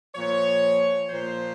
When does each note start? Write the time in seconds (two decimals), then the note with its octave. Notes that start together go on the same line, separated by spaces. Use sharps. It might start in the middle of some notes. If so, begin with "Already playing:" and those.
0.15 A#2 F3 C#5
1.09 A#2 F3 C5